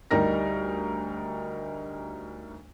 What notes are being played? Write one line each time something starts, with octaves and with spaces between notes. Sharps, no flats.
D2 G3 D#4 G4 A#4 A#6